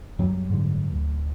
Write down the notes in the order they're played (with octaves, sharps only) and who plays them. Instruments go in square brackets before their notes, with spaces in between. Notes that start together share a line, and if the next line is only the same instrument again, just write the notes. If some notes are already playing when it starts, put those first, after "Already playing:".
[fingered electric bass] F#2 F#3 G3
[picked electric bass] G#2 D3
D1